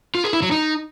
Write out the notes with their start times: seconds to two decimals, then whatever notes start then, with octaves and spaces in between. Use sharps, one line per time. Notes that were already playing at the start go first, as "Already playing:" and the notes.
0.15 F4
0.24 G#4
0.33 E4
0.42 F#3
0.52 D#4